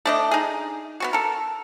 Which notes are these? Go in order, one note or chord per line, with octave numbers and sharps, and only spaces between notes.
A3 D4 D#5
D#4 G#4
B3 C4 F#4
A4 A#4